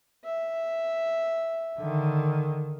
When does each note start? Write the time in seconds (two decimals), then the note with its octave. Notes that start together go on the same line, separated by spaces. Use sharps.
0.24 E5
1.79 D3 D#3